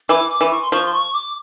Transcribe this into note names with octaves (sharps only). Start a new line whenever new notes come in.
E3 D6
D6
E3
C#6
C6
F3 C#6
C6
C#6
D6